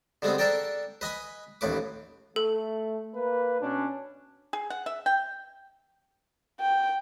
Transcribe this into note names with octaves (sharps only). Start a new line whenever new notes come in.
D3 G3 G#3 B3 C4
D4 A4 A#4 D5 G5
B4 D#5 G#5 B5
A1 D#2 A2 B4 D6
A3 A4
A#3 B4
B2 C#4 D4
G#4
F#5
E5
G5
G5